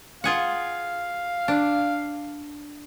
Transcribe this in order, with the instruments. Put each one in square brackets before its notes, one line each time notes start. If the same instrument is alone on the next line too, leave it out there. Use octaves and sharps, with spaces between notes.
[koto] F4 G#4 F#5 [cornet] F5
[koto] D4